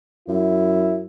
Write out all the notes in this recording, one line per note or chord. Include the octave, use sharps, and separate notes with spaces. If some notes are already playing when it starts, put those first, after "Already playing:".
F#2 E4